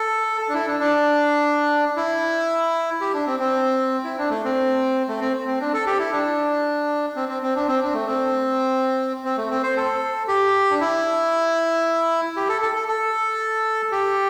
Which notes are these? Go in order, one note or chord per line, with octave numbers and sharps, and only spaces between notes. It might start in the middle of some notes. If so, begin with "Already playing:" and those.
Already playing: A4
A4
D4
E4
D4
D4
E4
G4
D4
C4
C4
E4
D4
A3
C4
A3
C4
C4
D4
A4
G4
E4
D4
C4
C4
C4
D4
C4
D4
A3
C4
C4
A3
C4
C5
A4
G4
D4
E4
G4
A4
A4
A4
A4
G4